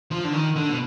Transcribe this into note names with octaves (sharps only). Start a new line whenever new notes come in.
F3
D3
D#3
D3
B2